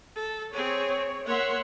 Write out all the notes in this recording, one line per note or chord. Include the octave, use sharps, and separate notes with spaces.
A4
C4 G#4 C#5
A#3 C#5 E5 F#5 C6